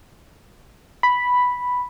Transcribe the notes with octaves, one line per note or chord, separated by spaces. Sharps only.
B5